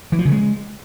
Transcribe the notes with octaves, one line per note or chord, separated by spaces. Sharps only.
E3
F3
C#3
G#3